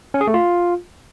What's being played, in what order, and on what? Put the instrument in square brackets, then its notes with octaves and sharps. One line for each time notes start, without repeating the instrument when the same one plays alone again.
[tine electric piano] C#4
G#4
A3
F4